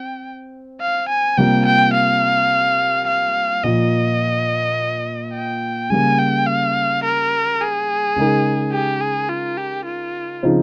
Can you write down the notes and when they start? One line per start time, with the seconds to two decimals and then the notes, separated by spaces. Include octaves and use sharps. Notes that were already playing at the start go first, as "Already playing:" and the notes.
Already playing: C4 G5
0.81 F5
1.09 G#5
1.37 C3 G3 A#3 F4 G5
1.66 G5
1.94 F5
3.08 F5
3.63 A#2 F3 A#3 D#5
5.34 G5
5.90 C#3 G3 A#3 G#5
6.18 G5
6.47 F5
7.04 A#4
7.60 G#4
8.16 C#3 G#3 D#4 A#4
8.72 G4
9.01 G#4
9.29 F4
9.58 G4
9.86 F4
10.43 C#3 F3 C4 D#4 G#4